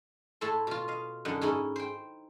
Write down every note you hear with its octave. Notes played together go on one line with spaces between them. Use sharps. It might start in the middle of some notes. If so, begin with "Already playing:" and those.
A2 E4 A4 A5 C6
B2 F4
D#5 F5
F#2 D3 D#4 F#5
G#2 C#4 D#4 E4
C5 G5